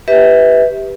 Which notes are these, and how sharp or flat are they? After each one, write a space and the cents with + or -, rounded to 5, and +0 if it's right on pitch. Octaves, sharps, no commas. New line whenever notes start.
G4 +0 B4 +0 E5 -30